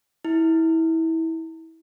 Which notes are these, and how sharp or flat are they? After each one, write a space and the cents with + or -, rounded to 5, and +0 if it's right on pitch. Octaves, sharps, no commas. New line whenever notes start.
E4 -25